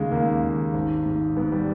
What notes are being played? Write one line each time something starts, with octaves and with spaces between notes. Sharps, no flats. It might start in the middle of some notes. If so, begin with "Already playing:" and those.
Already playing: D#2 C#3 G#3
D#2 A#3
D#2
G#1
G#2
G#2 B3
G3